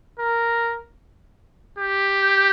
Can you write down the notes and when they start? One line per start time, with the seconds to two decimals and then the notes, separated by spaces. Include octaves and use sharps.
0.19 A#4
1.79 G4